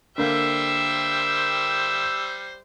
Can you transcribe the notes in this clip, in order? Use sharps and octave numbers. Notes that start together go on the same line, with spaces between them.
D3 G3 A#3 C5 E5 G5 E6